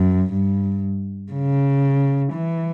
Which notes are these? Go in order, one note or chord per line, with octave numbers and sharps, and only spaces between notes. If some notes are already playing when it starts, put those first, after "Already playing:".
Already playing: F#2
G2
C#3
E3